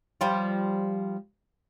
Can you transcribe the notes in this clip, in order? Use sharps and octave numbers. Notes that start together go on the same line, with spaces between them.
F3 G3 F4